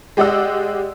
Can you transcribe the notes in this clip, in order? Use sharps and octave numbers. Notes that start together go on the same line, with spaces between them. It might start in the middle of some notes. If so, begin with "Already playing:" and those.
G#3 G4 D5 D#5 F#5 E6